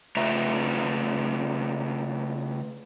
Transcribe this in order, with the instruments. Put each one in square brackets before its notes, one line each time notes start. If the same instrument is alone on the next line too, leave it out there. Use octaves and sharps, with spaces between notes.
[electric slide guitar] C#3 A3 F4 B4 E5 A#5